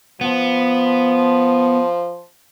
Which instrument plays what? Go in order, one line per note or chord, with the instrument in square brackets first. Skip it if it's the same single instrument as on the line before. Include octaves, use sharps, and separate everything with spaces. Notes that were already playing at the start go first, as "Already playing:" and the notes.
[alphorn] F3 [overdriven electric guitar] B3